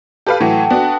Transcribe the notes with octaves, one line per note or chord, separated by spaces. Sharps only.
G4 A4 B4 F5
A2 E3 F#3 F#5 G5
B3 D4 F#4